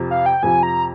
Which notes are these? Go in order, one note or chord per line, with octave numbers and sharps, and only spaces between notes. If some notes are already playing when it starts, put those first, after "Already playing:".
Already playing: F2 C3 F3
F5
G5
F2 C3 F3 G#5
A#5